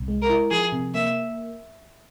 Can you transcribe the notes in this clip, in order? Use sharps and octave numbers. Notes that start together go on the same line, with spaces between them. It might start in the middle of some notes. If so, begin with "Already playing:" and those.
Already playing: C2
G#3
A#4
E4
F3 G#4
C3
A#3 E5